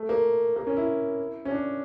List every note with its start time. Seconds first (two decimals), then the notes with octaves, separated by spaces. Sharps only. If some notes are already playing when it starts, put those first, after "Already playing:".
Already playing: A3
0.09 A#3
0.56 A#3
0.67 C#4
0.77 E4
1.45 C#4
1.51 D4